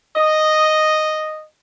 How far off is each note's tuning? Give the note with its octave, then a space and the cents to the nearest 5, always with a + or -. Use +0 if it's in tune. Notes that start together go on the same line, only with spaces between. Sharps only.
D#5 -5